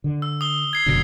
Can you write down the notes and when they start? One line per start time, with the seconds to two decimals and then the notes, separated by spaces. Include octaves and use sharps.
0.04 D3
0.22 E6
0.41 D#6 G7
0.73 G#6 C7
0.86 F#1 B2 D3